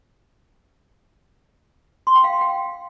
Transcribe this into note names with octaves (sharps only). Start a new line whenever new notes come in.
C6
G5
F5
C6
G5